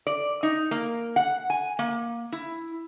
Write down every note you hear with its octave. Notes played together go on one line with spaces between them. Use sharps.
D5
D#4
A#3
F#5
G#5
A#3
E4